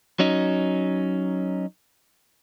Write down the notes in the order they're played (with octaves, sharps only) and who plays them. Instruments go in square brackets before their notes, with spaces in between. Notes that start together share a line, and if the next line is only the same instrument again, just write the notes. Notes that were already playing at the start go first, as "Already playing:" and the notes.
[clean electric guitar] F#3 C#4 D#4